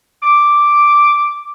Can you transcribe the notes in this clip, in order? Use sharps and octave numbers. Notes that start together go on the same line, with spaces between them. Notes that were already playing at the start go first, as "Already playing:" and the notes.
D6